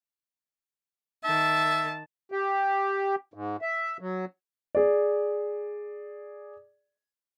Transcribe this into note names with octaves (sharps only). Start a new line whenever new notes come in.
D#3 E5 A5
G4
G#2
E5
F#3
G#4 D5